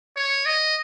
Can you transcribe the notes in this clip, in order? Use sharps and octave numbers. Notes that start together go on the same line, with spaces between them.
C#5
D#5